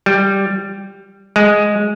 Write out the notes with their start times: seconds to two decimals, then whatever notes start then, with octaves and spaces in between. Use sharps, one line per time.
0.06 G3
1.36 G#3